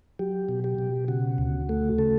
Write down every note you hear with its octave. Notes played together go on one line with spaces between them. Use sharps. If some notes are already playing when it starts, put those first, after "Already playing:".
F#3 G4
B2
G4
B2
C#3 F#4
D2
A3
C#3 A4